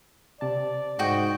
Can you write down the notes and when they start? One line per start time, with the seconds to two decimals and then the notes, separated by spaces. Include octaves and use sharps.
0.41 C3 D5 A5
0.99 G#2 F#4 D#5 G5